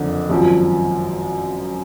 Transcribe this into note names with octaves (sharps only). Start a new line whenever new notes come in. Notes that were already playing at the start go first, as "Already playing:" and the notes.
Already playing: F#1 F2 D3
G#1 F#2 F3